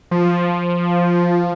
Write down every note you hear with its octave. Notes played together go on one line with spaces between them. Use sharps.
F3